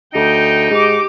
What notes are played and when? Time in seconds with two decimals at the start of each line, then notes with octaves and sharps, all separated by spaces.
0.14 D2 D#4 G5
0.71 G#2 G4 D6